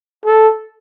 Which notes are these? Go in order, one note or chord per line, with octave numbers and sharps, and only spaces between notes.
A4